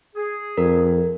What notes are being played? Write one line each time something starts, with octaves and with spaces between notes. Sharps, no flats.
G#4
F2 A#4